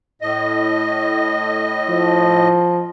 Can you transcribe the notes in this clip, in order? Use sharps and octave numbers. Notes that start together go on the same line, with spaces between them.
A2 D#5
F3